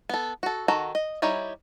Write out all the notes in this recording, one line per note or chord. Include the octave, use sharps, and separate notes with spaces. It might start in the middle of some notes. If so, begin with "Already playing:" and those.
B3 A4
F#4 A4
D#3 F#4 A4 F#5 A#5
D#5
G3 D#4 E4 G4 C#5